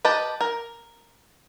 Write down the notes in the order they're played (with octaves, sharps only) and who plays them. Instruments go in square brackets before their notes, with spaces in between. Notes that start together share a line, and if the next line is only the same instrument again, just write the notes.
[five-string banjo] G4 B4 D#5 A5
A#4